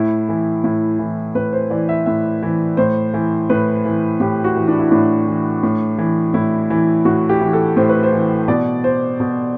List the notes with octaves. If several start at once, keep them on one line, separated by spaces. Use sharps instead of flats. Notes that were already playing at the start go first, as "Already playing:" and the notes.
Already playing: A2 E4
E3
A2 E4
E3
A2 B4
C5
E3 D5
E5
A2 E5
E3
A2 C5
E3
A2 B4
E3
A2 G4
F#4
E3
D4
E4
A2 D4
E3
A2
E3
A2 E4
E3
A2 F#4
G4
E3
A4
A2 C5
B4
C5
E3
B2 D5
C5
B2